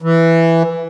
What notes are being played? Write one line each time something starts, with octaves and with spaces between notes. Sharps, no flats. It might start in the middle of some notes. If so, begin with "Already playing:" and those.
E3